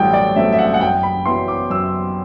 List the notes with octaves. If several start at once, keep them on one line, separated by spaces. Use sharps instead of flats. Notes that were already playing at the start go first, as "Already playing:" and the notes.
Already playing: A1 G2 F#3 A3 G5
D5
G2 F#3 A3 C4 E5
E5
F#5
F#5
F#2 G5
B5
F#3 B3 E4 C6
D6
F#2 E6